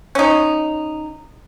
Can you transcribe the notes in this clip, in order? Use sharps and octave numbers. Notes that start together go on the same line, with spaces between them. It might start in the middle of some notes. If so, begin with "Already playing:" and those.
C#4 D#4